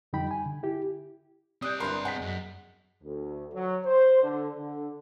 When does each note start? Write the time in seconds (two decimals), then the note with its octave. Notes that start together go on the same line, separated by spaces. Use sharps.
0.13 F2 D3 G3 D#4 G5 B5
0.31 G#5
0.46 D3
0.63 E4 G4
1.62 G3 C4 D5 D#6 F#6 G6
1.80 G1 E4 A#4 B5 C6
2.05 G#3 F#5 B6
2.21 F#2
3.03 D2
3.53 F#3
3.85 C5
4.22 D3
4.57 D3